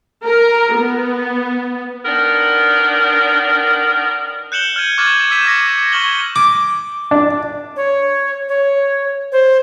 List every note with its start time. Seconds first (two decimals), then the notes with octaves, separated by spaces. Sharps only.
0.25 A#4
0.75 B3
2.05 D#3 B3 D4 A#4
4.52 F#6 G6 C#7 E7 F#7 G7
4.76 F6 G6 G#6 D#7
4.98 C#6 D6 F6 F#6 G#6 A6
5.31 E6 G6 G#6 B6 D#7 E7
5.45 D6 A#6 C#7
5.92 C#6 F6 G#6 F#7 G7
6.36 D6
7.11 D4
7.77 C#5
8.49 C#5
9.32 C5